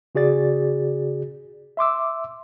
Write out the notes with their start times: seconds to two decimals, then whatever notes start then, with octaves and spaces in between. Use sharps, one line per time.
0.15 C#3 F#4 G#4 D5 A6
1.77 E5 C6 D6 E6